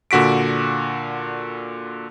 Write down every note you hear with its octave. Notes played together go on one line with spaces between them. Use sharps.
A#2 D3 F#4 B6 D7